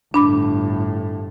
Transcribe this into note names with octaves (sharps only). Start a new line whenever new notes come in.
G1 A2 D4 B5 D6